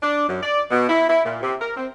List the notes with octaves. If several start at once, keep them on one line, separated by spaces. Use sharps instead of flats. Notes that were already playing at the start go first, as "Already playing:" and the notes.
D4
F#2
D5
B2
E4
E4
A#2
C3
A#4
C4